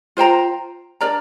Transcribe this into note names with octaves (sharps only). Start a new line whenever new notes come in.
F4 C5 G5 A#5
D4 A#4 D5 A#5